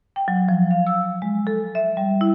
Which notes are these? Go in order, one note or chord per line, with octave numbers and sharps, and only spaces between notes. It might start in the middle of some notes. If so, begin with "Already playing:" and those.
G5
F#3
F3
F5
E6
G#3
A4
E5
G3
E4